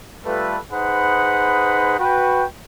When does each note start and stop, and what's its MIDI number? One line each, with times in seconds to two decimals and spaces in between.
0.25 0.57 55
0.25 0.57 57
0.25 0.57 65
0.25 0.57 69
0.25 0.57 71
0.71 1.94 63
0.71 1.94 68
0.71 1.94 71
0.71 1.94 72
0.71 1.94 78
0.71 1.94 83
1.98 2.44 66
1.98 2.44 71
1.98 2.44 79